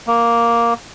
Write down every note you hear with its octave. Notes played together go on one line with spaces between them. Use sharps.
A#3